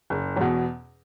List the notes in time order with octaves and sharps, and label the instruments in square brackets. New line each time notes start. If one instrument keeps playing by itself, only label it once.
[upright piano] F#1
E2 B2